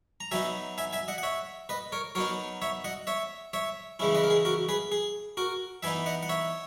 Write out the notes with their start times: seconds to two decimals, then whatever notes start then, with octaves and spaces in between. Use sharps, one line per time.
0.20 A#5
0.31 F#3 B3 D#4 E5 G#5
0.78 E5 G#5
0.93 E5 G#5
1.08 D#5 F#5
1.18 F#5
1.23 C#5 E5
1.69 B4 D#5
1.92 A#4 C#5
2.15 F#3 B3 D#4 A#4 C#5
2.62 C#5 E5
2.84 D#5 F#5
3.07 C#5 E5
3.53 C#5 E5
3.99 C#3 E3 G#3 C#4 E4
4.15 B4 D#5
4.24 A#4
4.30 G#4
4.45 F#4 A#4
4.69 G#4 B4
4.92 G#4
5.37 F#4 A#4
5.83 E3 B3 D#4 E5 G#5
6.06 D#5 F#5
6.23 F#5
6.29 C#5 E5